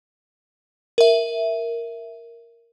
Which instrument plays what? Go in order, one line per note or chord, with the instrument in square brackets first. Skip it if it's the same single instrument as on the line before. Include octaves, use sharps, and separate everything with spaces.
[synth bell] A#4 E5